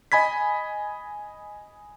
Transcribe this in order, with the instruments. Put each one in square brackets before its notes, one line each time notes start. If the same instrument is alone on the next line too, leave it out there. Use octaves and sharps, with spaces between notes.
[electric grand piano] D#5 G#5 B5 G#6 B6